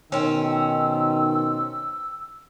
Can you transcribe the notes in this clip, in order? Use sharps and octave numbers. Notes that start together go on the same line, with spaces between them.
B2 D#3 C4 C#4 E6